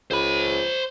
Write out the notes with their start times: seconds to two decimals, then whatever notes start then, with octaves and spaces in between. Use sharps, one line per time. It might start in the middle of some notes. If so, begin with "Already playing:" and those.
0.11 C#2 C5 B5